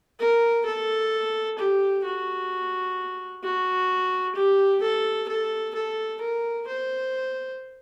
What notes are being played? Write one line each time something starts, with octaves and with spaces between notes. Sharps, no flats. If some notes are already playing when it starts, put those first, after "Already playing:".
A#4
A4
G4
F#4
F#4
G4
A4
A4
A4
A#4
C5